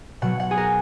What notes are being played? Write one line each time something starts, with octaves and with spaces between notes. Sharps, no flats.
B2 F#3 F#5
F#5
G#4
A#4